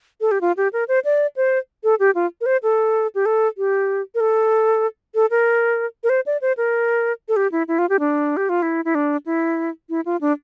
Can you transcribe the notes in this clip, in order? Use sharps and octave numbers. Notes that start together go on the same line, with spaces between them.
A4
G4
F4
G4
A#4
C5
D5
C5
A4
G4
F4
A#4
C5
A4
G4
A4
G4
A#4
A4
A4
A#4
A#4
C5
D5
C5
A#4
A4
G4
E4
E4
F4
G4
D4
G4
F4
E4
E4
D4
E4
E4
F4
D4